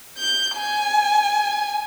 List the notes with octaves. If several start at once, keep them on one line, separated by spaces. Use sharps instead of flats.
G6
G#5